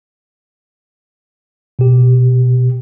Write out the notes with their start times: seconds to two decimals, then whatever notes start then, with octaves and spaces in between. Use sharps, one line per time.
1.79 B2 G4